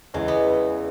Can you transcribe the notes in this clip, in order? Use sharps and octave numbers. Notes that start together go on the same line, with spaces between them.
E2 C#3 E3 G#3
B3